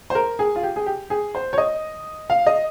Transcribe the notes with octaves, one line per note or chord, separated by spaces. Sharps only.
C5
A#4
G#4
F4
G4
G#4
G4
G#4
C5
C#5
D#5
F5
D#5